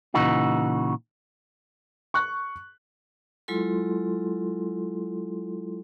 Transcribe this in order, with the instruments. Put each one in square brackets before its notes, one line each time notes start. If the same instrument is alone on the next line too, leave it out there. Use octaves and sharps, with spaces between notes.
[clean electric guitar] A#2 C#3 E3 D#4 F#4
[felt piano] C#6 F#6
[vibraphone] F#3 G#3 E4 F4 A4 C6